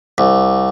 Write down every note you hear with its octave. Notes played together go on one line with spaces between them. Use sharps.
C2